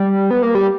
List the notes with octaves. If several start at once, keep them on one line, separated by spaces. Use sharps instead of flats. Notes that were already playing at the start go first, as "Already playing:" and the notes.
Already playing: G3
B3
A#3
G3